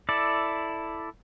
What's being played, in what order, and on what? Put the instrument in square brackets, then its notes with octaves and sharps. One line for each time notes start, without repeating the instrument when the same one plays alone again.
[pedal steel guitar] E4 A4 D5